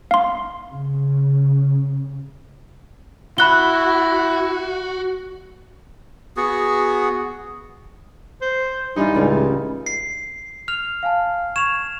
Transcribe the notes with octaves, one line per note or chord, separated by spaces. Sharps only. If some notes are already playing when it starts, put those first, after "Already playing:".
F5 C6
C#3
E4 F#4 B5 F#6 G7
B3 F#4 G#4
C5
G2 E3 D#4 F4
C#2 A2 C#3 G3
C7
F6 F7
F5 G#5 A5
C#6 G#6 E7 F7